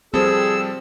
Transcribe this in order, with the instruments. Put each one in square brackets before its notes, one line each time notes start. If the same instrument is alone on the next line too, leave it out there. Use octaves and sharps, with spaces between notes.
[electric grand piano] F3 G3 A4 [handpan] C4 C5 [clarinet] G#4 [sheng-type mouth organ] E6